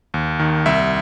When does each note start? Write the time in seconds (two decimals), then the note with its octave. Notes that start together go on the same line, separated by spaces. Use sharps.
0.14 D#2
0.39 D#3
0.66 C2 E5